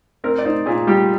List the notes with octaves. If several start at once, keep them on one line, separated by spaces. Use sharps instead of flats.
C4 A#4
D5
D#4 C5
A#2 G#4
G3 G4